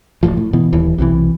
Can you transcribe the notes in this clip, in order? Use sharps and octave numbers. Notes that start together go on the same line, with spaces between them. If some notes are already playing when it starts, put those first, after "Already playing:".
D1 G1 A2 F3
A2
B2 E3
D#1 D#2 E3
B1 C3 D#3 E3